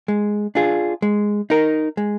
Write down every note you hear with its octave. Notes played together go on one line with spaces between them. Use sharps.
G#3
D4 F4 G#4
G#3
D#4 A#4
G#3